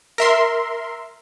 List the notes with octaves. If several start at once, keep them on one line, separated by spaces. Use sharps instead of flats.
A#4 E5 C6